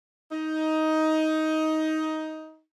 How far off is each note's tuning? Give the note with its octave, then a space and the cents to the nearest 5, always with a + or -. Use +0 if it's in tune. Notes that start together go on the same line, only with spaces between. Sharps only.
D#4 +15